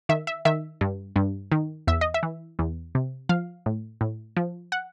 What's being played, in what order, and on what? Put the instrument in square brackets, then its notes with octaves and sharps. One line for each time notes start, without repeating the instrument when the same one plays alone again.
[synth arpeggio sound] D#3 E5
E5
D#3 E5
G2
G2
D#3
E2 E5
D#5
E5
E3
E2
C3
F3 F5
A2
A2
F3
F#5